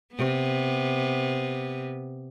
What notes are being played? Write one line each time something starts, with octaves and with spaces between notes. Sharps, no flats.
C3 B3